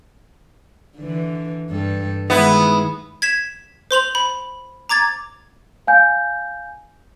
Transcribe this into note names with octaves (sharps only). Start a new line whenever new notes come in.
D3 E3
G2 A4
D#3 G#3 B3 E4 G#4
G#6 B6 E7
C5 C6 F7 F#7
B5
A#5 D6 G#6 A6
F5 G#5 G6